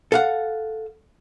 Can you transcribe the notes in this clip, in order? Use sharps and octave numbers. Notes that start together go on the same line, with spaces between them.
A4 F5 F#5